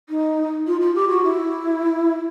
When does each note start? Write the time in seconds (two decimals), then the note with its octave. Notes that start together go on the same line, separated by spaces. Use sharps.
0.09 D#4
0.67 F4
0.81 F4
0.95 G4
1.09 F#4
1.24 E4